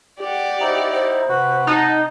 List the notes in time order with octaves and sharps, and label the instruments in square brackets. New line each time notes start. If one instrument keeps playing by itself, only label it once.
[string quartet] G4 D5 F#5
[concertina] D#4 E4 [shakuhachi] C5
[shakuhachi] C5
[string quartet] C3 [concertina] F#4 B4
[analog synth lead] D#4 [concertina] F#5 A5